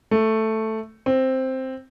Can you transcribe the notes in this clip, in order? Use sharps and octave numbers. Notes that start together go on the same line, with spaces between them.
A3
C4